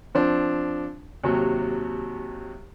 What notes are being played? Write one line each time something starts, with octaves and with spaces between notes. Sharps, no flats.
F3 C4 D4
D#2 C3 F#3